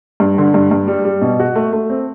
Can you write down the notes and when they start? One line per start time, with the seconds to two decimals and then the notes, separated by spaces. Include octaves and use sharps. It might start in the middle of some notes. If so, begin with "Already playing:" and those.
0.20 G2
0.38 D3
0.54 G2
0.71 G2
0.88 G3
1.05 G3
1.22 B2
1.40 F#4
1.55 A3
1.73 A3
1.90 C4